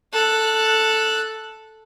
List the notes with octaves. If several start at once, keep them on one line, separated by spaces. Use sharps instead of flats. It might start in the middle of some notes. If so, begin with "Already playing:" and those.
A4 F#6